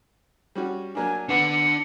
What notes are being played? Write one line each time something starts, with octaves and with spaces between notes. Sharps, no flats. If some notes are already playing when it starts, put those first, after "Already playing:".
G3 C#4 F#4
F#3 A#3 D4 G#5
B3 D4 F#5 C#7